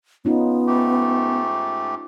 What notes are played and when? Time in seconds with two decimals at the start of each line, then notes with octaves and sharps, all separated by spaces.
0.25 B3 C#4 D#4 F4
0.67 G#2 A3 G4